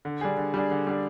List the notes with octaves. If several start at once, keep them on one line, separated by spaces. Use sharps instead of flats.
D3
G3 D4 G#4
D3
G3 D4 G#4
D3
G3 D4 G#4